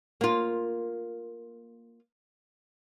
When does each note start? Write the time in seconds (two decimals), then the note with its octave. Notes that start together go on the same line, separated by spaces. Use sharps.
0.21 A#3 F4